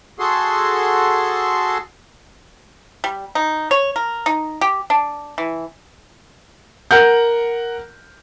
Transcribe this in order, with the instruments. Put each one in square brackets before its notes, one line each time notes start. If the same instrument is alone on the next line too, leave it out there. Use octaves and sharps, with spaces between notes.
[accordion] F#4 G#4 A4 C6
[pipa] G3
D#4
C#5
A#4
D#4
G4
D4
E3
[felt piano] A#4 F#5 G6